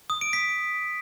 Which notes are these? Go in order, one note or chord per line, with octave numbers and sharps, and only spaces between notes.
D#6
D7
B6